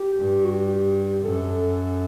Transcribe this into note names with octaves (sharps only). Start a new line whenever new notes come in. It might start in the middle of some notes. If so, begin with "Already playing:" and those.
Already playing: G4
G2
F#4
G4
F#2 A4